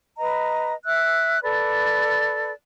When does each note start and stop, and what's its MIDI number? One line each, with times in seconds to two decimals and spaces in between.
0.17 0.73 71
0.17 0.73 75
0.17 0.73 82
0.85 1.39 76
0.85 1.39 88
0.85 1.39 90
1.42 2.51 69
1.42 2.51 71
1.42 2.51 74